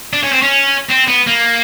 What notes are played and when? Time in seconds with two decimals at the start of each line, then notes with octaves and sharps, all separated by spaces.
0.13 D4
0.23 C#4
0.32 C4
0.42 C#4
0.89 C4
1.08 B3
1.27 A#3